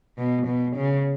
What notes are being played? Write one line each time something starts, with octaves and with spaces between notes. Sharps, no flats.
B2
B2
C#3